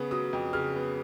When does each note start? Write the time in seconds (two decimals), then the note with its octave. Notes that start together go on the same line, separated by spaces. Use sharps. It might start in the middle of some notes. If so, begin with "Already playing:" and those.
Already playing: C#3 B3
0.11 F#3 D#6
0.33 F2
0.53 C#3 F6
0.75 B3